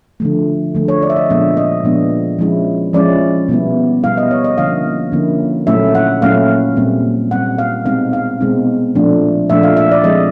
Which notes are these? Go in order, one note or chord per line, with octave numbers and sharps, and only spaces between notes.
D3 F3 A3
D3 F3 A3
C#5
D5
E5
D#5
A#2 F3 G#3 B3 D4 E5
D#5
A#2 F3 G#3 B3 D4
F3 G#3 C#4 E4
F3 G#3 C#4 E4 D5
B2 G3 B3 E4
B2 G3 B3 E4 F5
D#5
C#5
D#5
D3 F3 A#3 C#4 E4 F5
D3 F3 A#3 C#4 E4
A#2 F#3 A3 C#4 E4 E5
F#5
A#2 F#3 A3 C#4 E4 F5
A#2 G3 C4
A#2 G3 C4 F#5
F5
B2 G#3 C4 D#4 F5
F5
B2 G#3 C4 D#4
A#2 F3 A3 D4
A#2 F3 A3 D4 E5
F5
E5
D5
F3 G#3 C4 E4 D#5